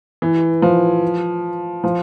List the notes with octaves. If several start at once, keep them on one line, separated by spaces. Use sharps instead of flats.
E3
F3
F3